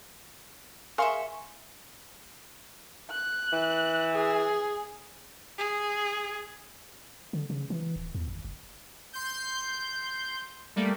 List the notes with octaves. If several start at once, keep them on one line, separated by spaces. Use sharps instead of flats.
G#4 A#4 E5 F5 C6 C#6
F#6
E3
G#4
G#4
D3
C#3
E3
D1
E2
G#1
F#1
C6 G6
G3 A3 A#3